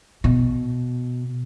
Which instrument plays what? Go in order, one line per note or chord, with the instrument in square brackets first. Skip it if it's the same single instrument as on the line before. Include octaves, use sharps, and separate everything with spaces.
[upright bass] B2